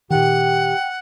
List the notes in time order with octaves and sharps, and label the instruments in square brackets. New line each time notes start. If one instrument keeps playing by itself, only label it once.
[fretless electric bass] A#2 D#3 [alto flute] G4 [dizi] F#5 [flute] G5